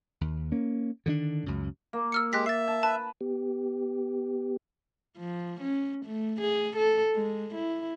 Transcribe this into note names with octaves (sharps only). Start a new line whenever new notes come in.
D#2
A#3 C#4
D3 D#3 C4 D4
C#2 F#2
A#3
E6 F6 C#7
G#3 G4 F#6 A#6 B6
E5 A6 C7
A5
B4 A5
B3 G4
F3
C#4
A3
G#4
A4
G#3
E4